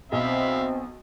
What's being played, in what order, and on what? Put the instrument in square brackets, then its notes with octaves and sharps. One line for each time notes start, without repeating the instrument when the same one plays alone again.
[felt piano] B1 [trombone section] C4 [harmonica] E5 F5 B5